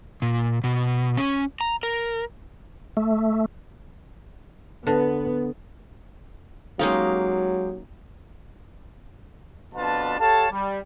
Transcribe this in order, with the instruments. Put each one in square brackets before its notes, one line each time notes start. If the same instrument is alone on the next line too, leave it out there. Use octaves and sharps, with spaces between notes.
[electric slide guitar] A#2
B2
C#4
A#5
A#4
[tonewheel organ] A3
[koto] D3 [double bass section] B3
[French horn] F#3 [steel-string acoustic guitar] G#3 G4 F5 [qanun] A#3 C#4 D#4
[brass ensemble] F2 B2 D4 F4 B4 A5
G4 A4 C#5 F5 A5
G3